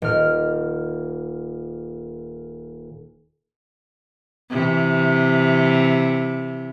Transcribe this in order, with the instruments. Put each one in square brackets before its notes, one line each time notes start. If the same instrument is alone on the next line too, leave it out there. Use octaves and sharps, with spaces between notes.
[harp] D#1 F6
[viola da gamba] C3 E3